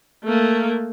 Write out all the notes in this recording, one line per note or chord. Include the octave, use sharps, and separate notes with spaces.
A3 A#3